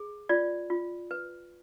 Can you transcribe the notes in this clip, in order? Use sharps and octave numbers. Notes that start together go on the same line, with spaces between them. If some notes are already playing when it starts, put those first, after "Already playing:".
Already playing: G#4
F4 D5
F4
B4